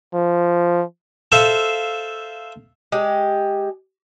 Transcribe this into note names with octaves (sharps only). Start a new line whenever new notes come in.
F3
A4 C5 E5 F5
G#3 G4